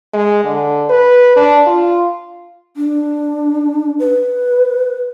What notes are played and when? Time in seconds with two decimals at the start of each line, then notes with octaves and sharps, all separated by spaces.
0.14 G#3
0.44 D3
0.90 B4
1.36 D4
1.67 F4
2.77 D4
3.99 B4